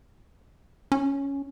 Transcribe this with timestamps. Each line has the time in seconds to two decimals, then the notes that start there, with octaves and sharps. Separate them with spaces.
0.92 C#4